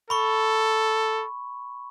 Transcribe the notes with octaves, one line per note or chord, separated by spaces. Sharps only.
A4 B5 C#6